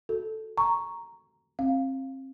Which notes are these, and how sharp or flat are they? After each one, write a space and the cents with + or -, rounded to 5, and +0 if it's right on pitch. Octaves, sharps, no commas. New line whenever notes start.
F#4 +0 A4 +0
A#5 +0 C#6 +0
C4 +30 F5 +0